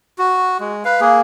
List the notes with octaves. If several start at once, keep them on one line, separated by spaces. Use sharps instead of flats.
F#4
G#3
B4 F5
A#3 G#4